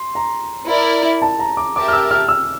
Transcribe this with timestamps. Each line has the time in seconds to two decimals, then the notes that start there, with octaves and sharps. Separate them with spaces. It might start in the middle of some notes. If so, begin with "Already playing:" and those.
Already playing: C6
0.15 A#5
0.69 E4 A#4 D5
1.22 A5
1.39 A#5
1.57 D6
1.75 G4 A#4 E5 A5 D6
1.88 F6
1.93 E6
2.11 F6
2.29 E6